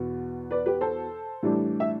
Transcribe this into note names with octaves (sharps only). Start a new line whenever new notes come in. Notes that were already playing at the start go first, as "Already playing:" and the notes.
Already playing: E2 B2 B3
B4 D5
G4 B4
A4 C5
A2 E3 G3 D4
E5